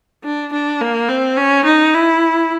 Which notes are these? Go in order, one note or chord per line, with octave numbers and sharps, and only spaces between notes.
D4
D4
A#3
C4
C#4
D#4
E4